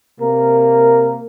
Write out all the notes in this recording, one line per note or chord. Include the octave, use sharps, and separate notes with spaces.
C3 A#3 A#4